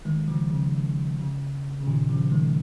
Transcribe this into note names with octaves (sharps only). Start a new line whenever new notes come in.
D#3 G#3
C#3 F3
C#3
C#3
C#3
A#2 D#3
C#3 F3
D#3 G#3